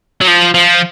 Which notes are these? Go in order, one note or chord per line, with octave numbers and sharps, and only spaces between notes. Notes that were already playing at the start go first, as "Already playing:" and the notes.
F#3
F3
F3